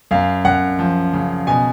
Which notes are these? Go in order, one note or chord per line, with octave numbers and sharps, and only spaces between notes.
F#2 F5
F#2 F#5
F3
C#3
B2 G#5